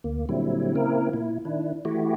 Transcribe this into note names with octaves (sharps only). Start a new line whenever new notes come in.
D2 A#3
A#2 D3 F#3 G3 C4 E4
C#3 A#3 C4 E4 A#4
A#2 E4
D#3 D4 E4
E3 A3 E4 F#4 G4